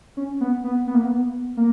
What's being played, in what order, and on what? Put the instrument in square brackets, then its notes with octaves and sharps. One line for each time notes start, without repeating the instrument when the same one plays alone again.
[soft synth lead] C#4
B3
B3
B3
A#3
B3
A#3